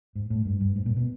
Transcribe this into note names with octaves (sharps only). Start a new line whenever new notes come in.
G#2
A2
G2
G2
G#2
A#2
B2